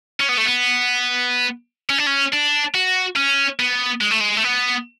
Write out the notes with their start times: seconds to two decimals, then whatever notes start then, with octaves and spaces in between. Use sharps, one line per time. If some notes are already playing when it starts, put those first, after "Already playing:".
0.20 C#4
0.29 B3
0.37 A3
0.46 B3
1.90 C#4
1.98 D4
2.06 C#4
2.33 D4
2.75 F#4
3.16 C#4
3.59 B3
4.01 G#3
4.11 A3
4.20 G#3
4.37 A3
4.44 B3